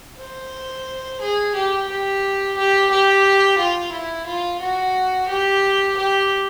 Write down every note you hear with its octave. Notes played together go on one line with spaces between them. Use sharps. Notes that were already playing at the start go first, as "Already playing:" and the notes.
C5
G#4
G4
G4
G4
G4
F4
E4
F4
F#4
G4
G4